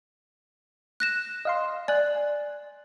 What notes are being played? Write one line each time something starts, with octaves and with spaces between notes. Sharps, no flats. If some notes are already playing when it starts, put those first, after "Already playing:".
F#6 A#6 E7
D#5 F5 C6
D5 G#5 F#6